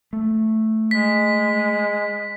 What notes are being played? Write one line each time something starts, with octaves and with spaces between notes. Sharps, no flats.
A3
G#3 B6